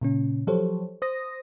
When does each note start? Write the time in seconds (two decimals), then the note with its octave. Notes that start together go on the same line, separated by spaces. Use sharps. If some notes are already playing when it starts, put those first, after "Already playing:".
0.01 A#2 C#3 C#4
0.47 F3 F#3 G4 A4 C5 C#5
1.02 C5 D#6 A#6